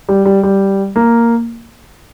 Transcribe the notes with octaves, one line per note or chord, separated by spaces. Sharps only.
G3
G3
G3
A#3